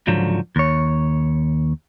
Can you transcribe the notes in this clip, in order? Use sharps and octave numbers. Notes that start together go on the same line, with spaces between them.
C#2 G#2 D3 F3 F#3
D#2 C#5